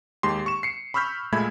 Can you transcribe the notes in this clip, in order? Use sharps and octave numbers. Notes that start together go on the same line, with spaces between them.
D#2 G#3 G4 C6
C#6 E7
C7 C#7
B5 C#6 E6 F6 G6 B6
A#2 G#3 A3 E5 B5 G#6